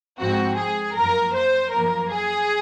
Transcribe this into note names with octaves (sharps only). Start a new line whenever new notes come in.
G#2 F3 C4 F#4
G#4
F#2 F3 A#3 A#4
C5
F#2 F3 A#3 A#4
G#4